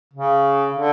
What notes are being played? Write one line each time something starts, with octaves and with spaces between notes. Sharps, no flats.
C#3
D3